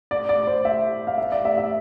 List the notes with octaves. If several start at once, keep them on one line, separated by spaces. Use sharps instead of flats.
D5
D5
C5
E5
F5
E5
D5
E5
E5